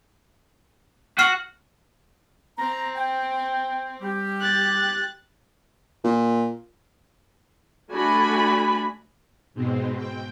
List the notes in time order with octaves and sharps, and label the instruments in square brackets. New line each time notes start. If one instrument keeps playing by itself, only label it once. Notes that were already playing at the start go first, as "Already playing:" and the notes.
[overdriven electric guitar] F#4 [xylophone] C#6 F6 C7
[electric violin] C4 [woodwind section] A#5
[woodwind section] G5
G3 G4
[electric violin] F#6 A6
[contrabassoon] A#2
[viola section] A3 D4 F#4 G#5 B5
[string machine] G#2 B2 G#3 C4
G5